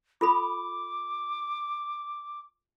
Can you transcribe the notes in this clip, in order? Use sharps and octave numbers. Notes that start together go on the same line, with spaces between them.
F4 A4 B5 D6